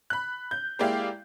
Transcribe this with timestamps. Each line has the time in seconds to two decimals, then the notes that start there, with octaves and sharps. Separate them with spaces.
0.10 B5 F#6
0.51 G6
0.79 G#3 A#3 E4 G4 D5 F5